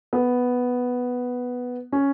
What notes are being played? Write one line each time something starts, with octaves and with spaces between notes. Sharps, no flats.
B3
C#4